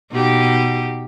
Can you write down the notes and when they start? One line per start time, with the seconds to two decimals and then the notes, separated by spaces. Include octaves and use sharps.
0.12 B2 D#4 G4